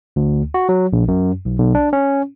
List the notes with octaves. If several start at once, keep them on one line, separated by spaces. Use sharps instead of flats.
D2
F#4
F#3
A#1
F#2
B1
B1
D4
C#4